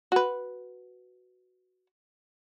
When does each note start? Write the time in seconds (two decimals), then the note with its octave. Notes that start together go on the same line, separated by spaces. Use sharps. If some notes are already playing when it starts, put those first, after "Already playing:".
0.12 F#4 B4